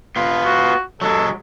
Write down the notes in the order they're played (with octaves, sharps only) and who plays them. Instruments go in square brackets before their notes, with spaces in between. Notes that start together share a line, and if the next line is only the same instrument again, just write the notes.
[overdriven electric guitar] B3 F4
[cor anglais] F#4
[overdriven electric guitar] F#3 G#3 [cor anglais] A4